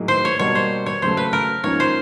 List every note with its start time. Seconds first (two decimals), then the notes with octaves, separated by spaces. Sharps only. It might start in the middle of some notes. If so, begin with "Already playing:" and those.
Already playing: A2 F#3 A#3 D#4 G#4
0.08 C5
0.25 C#5
0.39 B2 G3 A#3 D4 F#4 C#5
0.55 C5
0.86 C#5
1.02 C#3 F#3 A3 C5
1.17 B4
1.33 A#4
1.64 G#2 F3 A#3 C#4 C#5
1.80 C5